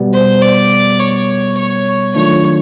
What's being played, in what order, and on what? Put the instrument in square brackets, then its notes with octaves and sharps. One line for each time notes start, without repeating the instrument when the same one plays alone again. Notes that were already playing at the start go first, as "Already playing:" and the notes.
Already playing: [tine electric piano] B2 G3 B3
[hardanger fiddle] C5
D5
C#5
C#5
[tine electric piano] D#3 F#3 A3 D4 F4 [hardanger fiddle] C#5